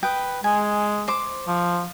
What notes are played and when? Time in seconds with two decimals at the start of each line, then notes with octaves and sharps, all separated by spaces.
0.03 B4 G5 D#6
0.44 G#3 G#5
1.08 C5 D6
1.48 F3